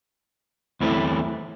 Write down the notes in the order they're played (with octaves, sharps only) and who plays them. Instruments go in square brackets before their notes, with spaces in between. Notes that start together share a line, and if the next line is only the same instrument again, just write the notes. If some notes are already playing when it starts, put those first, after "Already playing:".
[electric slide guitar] E2 E3 A3 C4 E4